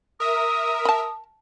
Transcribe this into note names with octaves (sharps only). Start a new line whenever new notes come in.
A#4 E5 D#6
A5 B5